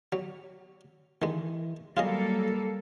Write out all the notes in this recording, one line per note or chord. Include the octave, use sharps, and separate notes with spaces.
F#3
D#3 E3 G#3
F#3 G3 A#3 F4 G#4 A4 D#5